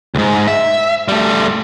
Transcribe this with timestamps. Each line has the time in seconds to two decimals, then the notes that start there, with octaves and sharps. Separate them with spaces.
0.15 C#2 G#2
0.47 E5
1.08 G3 A3